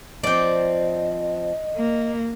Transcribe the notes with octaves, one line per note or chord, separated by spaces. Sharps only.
F3 C4 D5 D#5 G5
A#3